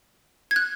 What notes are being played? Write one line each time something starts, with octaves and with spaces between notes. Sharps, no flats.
G#6
F#6